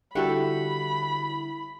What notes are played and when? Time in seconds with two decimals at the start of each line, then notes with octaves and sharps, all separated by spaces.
0.15 D3 G3 E4 F#4 G4 A4 B5